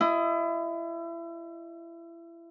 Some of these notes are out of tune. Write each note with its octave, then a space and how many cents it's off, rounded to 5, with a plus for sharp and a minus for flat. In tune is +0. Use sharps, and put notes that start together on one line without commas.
E4 +30 D#5 +15